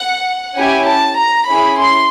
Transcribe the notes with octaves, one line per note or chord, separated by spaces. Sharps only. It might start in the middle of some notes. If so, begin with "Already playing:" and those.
Already playing: F#5
C#4 E4 G4 G#5
A5
A#5
C#4 E4 G#4 B5
C6